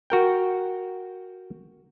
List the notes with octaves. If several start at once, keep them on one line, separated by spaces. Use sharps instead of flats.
F#4 A#4 G5